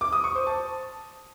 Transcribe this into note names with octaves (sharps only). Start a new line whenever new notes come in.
D6
D#6
C#6
C5
A5